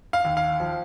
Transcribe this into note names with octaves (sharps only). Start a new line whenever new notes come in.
F5
D#2
F5
F3